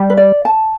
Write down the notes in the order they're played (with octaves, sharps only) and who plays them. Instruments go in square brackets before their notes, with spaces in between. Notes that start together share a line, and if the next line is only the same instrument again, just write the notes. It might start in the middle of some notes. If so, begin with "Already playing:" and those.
Already playing: [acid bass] G3
[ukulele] B4
D5
A5